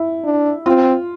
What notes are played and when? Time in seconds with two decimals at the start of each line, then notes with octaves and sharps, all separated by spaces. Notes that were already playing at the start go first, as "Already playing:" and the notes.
Already playing: E4
0.24 D4
0.66 C4 F4